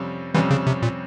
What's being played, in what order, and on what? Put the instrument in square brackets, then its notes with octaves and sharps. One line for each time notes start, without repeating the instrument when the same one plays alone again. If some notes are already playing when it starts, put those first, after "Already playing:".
Already playing: [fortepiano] F2 C3 G3 C#4
[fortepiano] F2 C3 G3 C#4 [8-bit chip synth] E3
[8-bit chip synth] C#3
C3
A#2